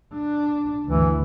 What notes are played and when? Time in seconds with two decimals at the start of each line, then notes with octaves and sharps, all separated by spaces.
0.14 D4
0.87 D2 G2 E3